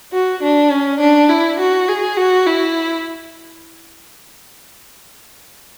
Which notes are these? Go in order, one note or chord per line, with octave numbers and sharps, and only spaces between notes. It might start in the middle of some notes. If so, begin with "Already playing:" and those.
F#4
D4
C#4
D4
E4
F#4
G#4
F#4
E4